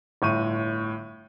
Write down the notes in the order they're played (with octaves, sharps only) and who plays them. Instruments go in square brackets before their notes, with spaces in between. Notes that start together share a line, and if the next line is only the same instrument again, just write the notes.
[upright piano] G1 A2 C#6 D#7